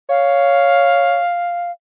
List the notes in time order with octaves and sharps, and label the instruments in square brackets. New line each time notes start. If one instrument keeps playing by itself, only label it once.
[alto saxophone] C#5 [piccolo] F5